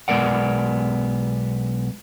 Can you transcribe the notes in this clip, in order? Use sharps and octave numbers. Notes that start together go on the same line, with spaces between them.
B1 G#3 B3 A#4 D5 F#5